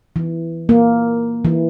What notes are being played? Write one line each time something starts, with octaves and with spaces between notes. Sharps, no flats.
E3
A#3
E3